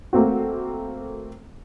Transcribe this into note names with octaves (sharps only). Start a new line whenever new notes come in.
A3 A#3 C4 F#4